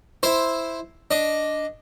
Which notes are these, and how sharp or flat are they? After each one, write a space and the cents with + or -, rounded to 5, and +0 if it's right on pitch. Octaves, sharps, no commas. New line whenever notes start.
E4 +0 C5 +0
D4 +0 D#5 +0